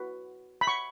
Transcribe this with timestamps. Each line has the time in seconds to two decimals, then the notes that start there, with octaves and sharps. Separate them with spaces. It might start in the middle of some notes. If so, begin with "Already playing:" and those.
Already playing: F#4 B4
0.61 B5
0.67 C#6